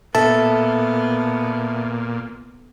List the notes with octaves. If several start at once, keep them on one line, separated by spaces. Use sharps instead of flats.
A#2 B3 A4 E5 A5